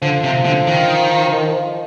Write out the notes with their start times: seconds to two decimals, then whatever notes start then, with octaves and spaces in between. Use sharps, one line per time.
0.02 D3 F3
0.24 C3
0.45 D3
0.67 D#3
1.24 F3
1.32 D#3
1.53 F3